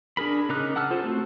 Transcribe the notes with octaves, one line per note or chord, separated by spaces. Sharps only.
D4 G#4 A#4 B5
C#3 D#4 A#4 D6 F#6
F#5 A5 E6 F6
F4 A4 C5
A3 C4 F#4